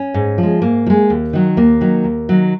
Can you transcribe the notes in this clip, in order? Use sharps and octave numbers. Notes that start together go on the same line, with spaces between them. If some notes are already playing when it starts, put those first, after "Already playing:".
Already playing: C#4
G#2
F3
G#3
G#2 A#3
F3
G#3
D#2
D#3 F#3
D#2 A#3
D#3 F#3
D#2
D#3 F#3